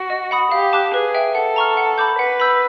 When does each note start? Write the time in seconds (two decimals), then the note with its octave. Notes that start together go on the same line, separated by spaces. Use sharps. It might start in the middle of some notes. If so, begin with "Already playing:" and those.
Already playing: F#4
0.10 D#5
0.31 F#5 B5 D#6
0.51 G4 F5
0.73 A5 D6 F#6
0.94 G#4 B4
1.14 E5 G5
1.35 A4 F#5
1.56 A#5 C#6 F6
1.77 F#5
1.98 B5 D6 G6
2.19 B4 F#5
2.40 B5 E6 G6